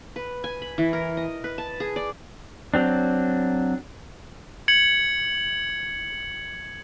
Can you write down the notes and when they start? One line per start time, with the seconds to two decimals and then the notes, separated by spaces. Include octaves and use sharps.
0.16 B4
0.44 G#5
0.62 B5
0.78 E3
0.93 A#4
1.17 D#5
1.44 B4
1.58 A5
1.80 G#4
1.96 D5
2.74 F#3 C4 D4
4.68 G#6 C#7 F#7